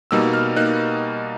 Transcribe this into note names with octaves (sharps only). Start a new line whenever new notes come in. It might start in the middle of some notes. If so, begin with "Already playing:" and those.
B2 G3 A#3 D#4 E6
F6
A#3 D#4 F#6